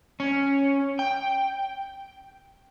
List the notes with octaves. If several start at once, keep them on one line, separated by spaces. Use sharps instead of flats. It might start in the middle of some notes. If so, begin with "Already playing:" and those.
C#4
G5